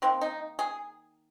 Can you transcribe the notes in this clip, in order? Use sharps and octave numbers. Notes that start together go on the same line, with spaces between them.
D#3 A#3 C4
D#4
G#4